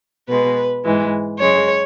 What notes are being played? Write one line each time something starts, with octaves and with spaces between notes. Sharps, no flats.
B2 G#3 B4
G#2 E3 G#3
F#2 C#3 G#3 C#5